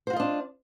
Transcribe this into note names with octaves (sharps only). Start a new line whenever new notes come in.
D4 F4 F#4 C5 D#5